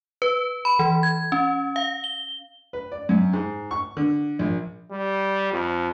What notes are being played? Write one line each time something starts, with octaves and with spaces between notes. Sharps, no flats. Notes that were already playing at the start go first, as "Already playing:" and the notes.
B4
B5
E3
G#6
C#4
F5
G7
B4
D5
F#2
G#2
C#6
D3
A#1
G3
F2